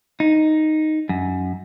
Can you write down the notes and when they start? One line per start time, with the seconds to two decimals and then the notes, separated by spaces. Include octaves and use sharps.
0.20 D#4
1.09 F#2